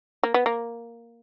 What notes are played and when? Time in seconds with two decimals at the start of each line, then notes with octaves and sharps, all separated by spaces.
0.23 A#3
0.34 B3
0.46 A#3